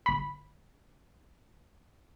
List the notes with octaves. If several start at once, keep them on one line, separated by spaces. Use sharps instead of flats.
G1 B5